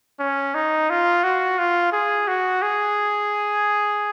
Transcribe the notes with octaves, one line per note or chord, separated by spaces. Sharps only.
C#4
D#4
F4
F#4
F4
G#4
F#4
G#4